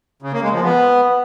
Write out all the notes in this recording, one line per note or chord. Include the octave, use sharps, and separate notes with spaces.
C#3
A#3
G#3
F3
B3